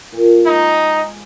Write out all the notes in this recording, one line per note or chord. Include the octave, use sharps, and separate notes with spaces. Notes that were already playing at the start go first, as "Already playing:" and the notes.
A#2
G#3 D#4 C5 D6